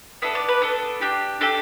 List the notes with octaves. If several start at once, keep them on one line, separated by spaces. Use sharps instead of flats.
B3 D4 A4 E5
D5
B4
B3 D4 A4
D4 G4
D4 G4 A4